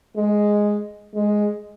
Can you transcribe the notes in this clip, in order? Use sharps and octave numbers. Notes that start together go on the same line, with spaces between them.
G#3
G#3